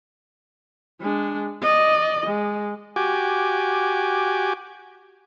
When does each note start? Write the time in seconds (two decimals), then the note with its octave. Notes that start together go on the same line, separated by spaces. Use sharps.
1.00 G#3 D4
1.62 D5 D#5
2.26 G#3
2.96 F#4 G4 G#5 D6